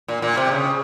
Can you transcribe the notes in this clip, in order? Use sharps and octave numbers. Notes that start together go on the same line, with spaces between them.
A#2
A#2
C3
C#3